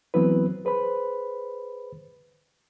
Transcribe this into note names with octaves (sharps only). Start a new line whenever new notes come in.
E3 F#3 B3 C4 E4 B4
G#4 B4 C5 B5